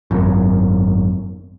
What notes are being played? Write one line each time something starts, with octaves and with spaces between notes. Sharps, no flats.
G#1 F#2